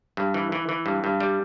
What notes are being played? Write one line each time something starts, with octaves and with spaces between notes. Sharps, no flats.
G2
E3
E3
E3
G2
G2
G3